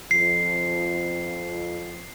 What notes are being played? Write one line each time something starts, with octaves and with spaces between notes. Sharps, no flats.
F2 F3 C7